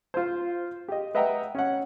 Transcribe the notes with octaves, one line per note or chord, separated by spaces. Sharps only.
F4 C5
G4 D#5
B4 D#5 E5 F#5 G5 A#5
C#4 F#5